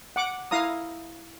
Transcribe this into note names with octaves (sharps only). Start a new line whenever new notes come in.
F#5 D6
E4 F5 A#5 D#6